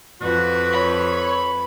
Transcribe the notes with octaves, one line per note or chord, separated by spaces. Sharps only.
F2 F#4 B4
C#5 B5